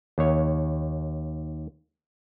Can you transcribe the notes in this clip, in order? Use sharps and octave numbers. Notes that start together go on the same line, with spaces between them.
D#2 C#5